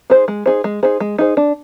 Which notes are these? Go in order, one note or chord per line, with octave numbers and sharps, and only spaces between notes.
D#4 G#4 C5
G#3
D#4 G#4 C5
G#3
D#4 G#4 C5
G#3
D#4 G#4 C5
D4